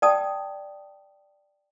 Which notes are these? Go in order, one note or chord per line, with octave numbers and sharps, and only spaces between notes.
D5 G5 A5 D#6